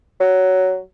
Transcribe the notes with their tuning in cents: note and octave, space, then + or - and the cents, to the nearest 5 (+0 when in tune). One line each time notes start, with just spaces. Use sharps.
F#3 +10